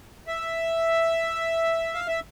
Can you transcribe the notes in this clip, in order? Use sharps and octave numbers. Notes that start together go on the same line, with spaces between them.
E5
F5
E5